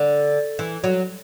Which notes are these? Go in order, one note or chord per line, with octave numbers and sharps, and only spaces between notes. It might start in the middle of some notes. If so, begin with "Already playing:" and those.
Already playing: D3
E3
F#3